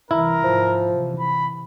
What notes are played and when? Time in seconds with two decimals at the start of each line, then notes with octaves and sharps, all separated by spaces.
0.11 C2 E3 E4 A#4
0.44 G#2 F3
0.89 C3 E3
1.20 B5